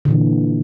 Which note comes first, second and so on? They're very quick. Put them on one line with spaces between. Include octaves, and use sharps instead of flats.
D3 A#2 E3